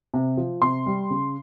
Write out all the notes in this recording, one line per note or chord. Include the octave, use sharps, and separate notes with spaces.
C3
F3
C3 C6
G3
C#3